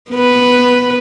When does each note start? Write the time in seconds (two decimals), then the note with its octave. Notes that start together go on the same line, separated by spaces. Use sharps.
0.11 B3 B4